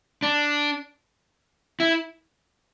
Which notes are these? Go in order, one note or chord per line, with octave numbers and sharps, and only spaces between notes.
D4
E4